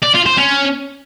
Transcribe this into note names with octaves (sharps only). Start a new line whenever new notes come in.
D5
F4
C5
C#4